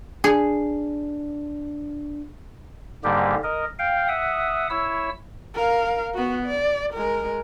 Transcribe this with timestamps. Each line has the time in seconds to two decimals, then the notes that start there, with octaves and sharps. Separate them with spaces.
0.24 D4 G#4
3.04 G#2 D3 G3 A#3 G4
3.44 A#4 D#5
3.79 F5 G5
4.08 E5 F#5 D#6
4.70 E4 C#5 E6
5.54 A#4 F5
6.14 B3 F#4
6.46 D5
6.93 G#3 A#4